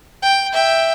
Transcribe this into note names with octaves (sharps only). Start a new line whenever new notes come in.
G5
E5 G5